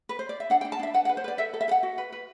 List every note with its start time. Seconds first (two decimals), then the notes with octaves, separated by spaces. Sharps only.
0.09 B4
0.19 C5
0.29 D5
0.40 E5
0.50 D4 F#5
0.61 G5
0.65 D4
0.72 A5
0.79 D4 E5
0.94 B4 F#5
1.05 F#5
1.09 B4
1.17 C5
1.24 B4 D5
1.38 A4 E5
1.54 A4
1.61 E5
1.68 A4
1.71 F#5
1.83 F#4
1.98 B4
2.12 B4